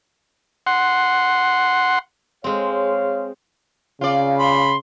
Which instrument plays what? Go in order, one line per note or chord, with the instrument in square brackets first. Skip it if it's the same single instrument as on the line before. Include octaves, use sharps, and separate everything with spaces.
[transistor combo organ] F#5 C6
[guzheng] G#3 C4 [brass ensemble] C#5 F5
[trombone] C#3 [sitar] F4 D5
[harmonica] B5 [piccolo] C6